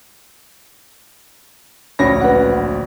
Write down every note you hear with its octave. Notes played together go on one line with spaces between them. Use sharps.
D1 A#1 C#4 C#5 B5 A#6
B4 F#5